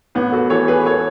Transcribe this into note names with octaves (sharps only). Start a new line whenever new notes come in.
A1 B3
F#4 A4
E3 A4 C#5
G#4 B4
A4 C#5